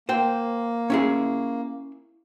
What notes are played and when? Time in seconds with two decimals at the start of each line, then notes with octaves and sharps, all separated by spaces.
0.09 A#3 C5 G5
0.90 C#4 E4 G#4